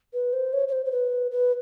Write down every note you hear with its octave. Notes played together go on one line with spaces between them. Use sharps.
B4
C5
C#5
C#5
C5
C5
B4
B4